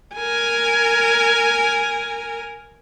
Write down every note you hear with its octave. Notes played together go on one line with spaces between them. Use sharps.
A#4 G#5